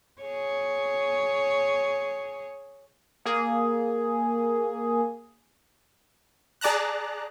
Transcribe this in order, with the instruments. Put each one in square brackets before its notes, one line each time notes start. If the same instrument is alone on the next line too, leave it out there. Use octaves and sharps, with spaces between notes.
[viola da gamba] G#4 C#5
[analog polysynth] A#3 G#4
[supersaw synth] G#4 D5 A5 A#5 F#6